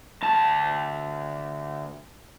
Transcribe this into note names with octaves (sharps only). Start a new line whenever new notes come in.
D2 A5